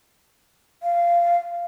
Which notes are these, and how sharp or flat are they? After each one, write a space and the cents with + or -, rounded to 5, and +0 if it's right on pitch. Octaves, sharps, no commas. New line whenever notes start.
F5 -15